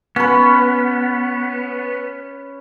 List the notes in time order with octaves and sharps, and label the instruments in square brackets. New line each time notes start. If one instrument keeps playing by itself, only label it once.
[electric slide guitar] B3 [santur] C#4 B4